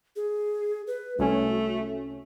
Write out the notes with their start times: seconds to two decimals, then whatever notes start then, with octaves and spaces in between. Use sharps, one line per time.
0.16 G#4
0.87 B4
1.18 C2 A3 C#4 F#4